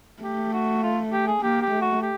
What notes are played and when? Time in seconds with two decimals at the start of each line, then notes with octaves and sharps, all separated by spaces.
0.23 A3 G4
0.53 F#4
0.83 F4
1.12 G4
1.27 G#4
1.42 A#3 G4
1.61 G4
1.71 A3
1.81 F#4
2.02 G4